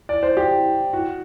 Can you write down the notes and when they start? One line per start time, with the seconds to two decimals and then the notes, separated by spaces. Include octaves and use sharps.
0.09 D5
0.23 C5
0.37 G4
0.93 F#4